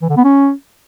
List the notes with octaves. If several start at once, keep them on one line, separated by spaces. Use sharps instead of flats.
E3
D3
B3
C#4